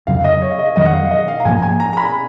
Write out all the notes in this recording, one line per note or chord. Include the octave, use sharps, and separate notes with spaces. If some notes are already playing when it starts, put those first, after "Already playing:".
F2 C#3 F#3 F5
D#5
C#5
F5
D#5
F2 D#3 F#3 D#5
F#5
F5
D#5
F5
A#5
G#2 F3 A#3 G#5
G#5
A#5
A#5
B5